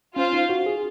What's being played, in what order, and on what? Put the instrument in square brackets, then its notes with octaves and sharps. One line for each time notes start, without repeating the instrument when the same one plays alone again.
[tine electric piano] C#4 [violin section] F4 C5 F5
[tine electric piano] D#4
F#4
G#4